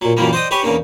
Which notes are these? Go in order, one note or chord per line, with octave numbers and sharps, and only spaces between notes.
A#2 F#3
F#2 A#2 E3 G3 A#3
C5 D5 D#5 G5 D#6
G4 B4 C#5 G#5 B5
E2 C#3 A#3 D4